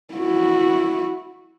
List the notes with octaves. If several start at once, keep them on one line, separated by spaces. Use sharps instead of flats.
E4 F#4